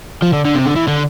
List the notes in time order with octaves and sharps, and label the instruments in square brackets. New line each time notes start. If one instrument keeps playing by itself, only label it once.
[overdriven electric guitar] F3
D3
D3
C3
D3
E3
D3